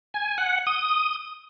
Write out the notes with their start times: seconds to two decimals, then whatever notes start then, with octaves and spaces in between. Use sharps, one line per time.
0.14 G#5
0.38 F#5
0.67 D#6